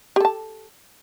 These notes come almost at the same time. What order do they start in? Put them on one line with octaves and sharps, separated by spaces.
G4 A4 A5